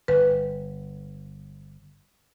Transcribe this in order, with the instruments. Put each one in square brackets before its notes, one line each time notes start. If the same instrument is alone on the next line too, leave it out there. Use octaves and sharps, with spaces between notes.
[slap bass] G1 [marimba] B4